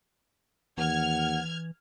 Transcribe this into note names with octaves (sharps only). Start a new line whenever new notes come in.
D#2 E3 F#5 F6 G#6